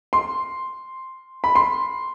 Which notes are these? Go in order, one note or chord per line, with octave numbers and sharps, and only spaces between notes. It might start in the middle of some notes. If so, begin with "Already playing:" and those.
C6
B5
C6